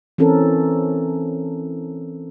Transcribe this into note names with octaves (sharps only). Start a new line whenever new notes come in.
E3 C4 C#4 A4 A#4